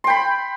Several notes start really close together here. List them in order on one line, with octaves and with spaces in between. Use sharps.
C6 G5 B5